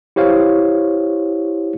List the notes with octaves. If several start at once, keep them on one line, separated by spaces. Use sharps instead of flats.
E4 G4 C5 C#5 F5